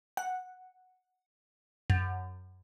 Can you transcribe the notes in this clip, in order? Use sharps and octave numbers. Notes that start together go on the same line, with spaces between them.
F#5
F#2